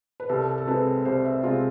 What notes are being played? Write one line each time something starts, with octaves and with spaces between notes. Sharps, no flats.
B4
C2 A4
A4
C3 G#3 C4 B4
C2 C5
E5
C3 G#3 C4 F4